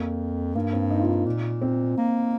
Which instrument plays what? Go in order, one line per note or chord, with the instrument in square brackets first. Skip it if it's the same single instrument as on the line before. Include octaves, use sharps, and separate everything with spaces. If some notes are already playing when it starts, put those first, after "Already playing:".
Already playing: [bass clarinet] F2 [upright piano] A#3
[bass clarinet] G2 [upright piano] A#3
[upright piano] C4
D#4
F4
D#4
[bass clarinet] A#2
[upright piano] C4
[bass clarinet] A#3